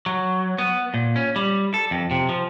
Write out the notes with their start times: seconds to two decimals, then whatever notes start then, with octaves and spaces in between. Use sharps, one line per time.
0.06 F#3
0.58 B3
0.94 A#2
1.16 C#4
1.36 G3
1.74 A4
1.91 F2
2.11 C3
2.29 F3